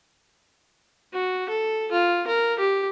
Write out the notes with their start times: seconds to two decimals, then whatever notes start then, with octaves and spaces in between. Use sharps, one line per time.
1.14 F#4
1.49 A4
1.92 F4
2.27 A#4
2.59 G4